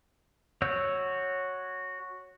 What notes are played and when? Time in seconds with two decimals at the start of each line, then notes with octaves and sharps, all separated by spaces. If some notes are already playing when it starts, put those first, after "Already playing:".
0.62 F#4 C#5 E6 G6